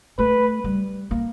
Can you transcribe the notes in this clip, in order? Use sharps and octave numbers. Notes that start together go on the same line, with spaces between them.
A3 B4
G3
A#3